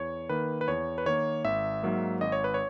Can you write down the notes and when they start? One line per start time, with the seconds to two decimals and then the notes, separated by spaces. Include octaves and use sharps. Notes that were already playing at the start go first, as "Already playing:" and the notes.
Already playing: E2 C#5
0.29 D#3 A#3 B4
0.61 B4
0.68 E2 C#5
0.98 B4
1.06 D#3 A#3 C#5
1.44 G#1 E5
1.83 G#2 F#3 A#3
2.21 G#1 D#5
2.32 C#5
2.44 B4
2.54 C#5